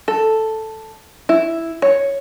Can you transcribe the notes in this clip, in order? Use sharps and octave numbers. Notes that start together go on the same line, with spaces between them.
A4
E4
C#5